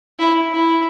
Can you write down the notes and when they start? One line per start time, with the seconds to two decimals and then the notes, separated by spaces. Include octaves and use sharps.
0.19 E4
0.53 E4